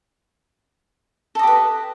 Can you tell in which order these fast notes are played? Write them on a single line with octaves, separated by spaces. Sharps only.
A4 D#5 G4 B4